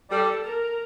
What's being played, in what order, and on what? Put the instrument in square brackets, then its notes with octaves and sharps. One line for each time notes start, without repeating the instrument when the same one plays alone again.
[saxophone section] G3 [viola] A4
[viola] A#4